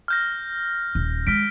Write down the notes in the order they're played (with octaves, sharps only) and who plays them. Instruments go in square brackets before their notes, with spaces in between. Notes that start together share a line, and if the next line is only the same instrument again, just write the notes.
[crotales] F6 G6 A#6
[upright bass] D#1
[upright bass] G#3 [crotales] F6 B6 D7